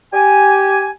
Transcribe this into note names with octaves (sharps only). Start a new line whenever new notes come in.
G4 G#5